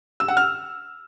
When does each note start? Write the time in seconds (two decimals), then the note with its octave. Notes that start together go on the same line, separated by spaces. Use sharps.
0.20 E6
0.28 F#5
0.37 F6